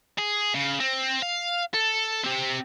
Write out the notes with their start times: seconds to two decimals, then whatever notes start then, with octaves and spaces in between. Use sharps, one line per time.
0.18 G#4
0.55 C#3
0.80 C4
1.22 F5
1.74 A4
2.24 C4 G4